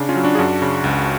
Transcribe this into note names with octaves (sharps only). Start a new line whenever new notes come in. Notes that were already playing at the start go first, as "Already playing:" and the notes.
Already playing: C#3 D4
C#4 F4
F#3
D4 F#4
G#4
F#2 D4 F#4
C#3
C#2